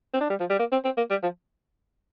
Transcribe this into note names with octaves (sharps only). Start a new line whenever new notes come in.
C4
D4
G3
F3
G3
A#3
C4
C4
A#3
G3
F3